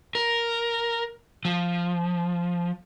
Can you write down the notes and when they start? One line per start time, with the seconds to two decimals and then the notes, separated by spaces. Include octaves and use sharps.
0.15 A#4
1.45 F3